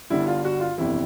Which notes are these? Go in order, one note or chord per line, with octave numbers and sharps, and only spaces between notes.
G1 G2 D3 E4
F4
F#4
F4
G1 F2 C3 E3 E4